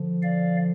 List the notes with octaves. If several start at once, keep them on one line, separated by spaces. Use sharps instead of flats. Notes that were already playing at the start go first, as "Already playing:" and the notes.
Already playing: D3 F3
D5 F5